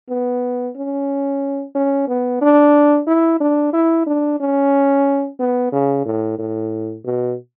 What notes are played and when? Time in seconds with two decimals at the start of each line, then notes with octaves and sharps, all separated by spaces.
0.09 B3
0.76 C#4
1.75 C#4
2.08 B3
2.41 D4
3.07 E4
3.40 D4
3.73 E4
4.06 D4
4.40 C#4
5.39 B3
5.72 C#3
6.05 A2
6.38 A2
7.05 B2